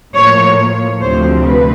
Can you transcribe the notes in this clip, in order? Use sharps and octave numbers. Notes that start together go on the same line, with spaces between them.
A2 F3 A#3 C#5
D2 C3 F3 A3 C4 C5
B4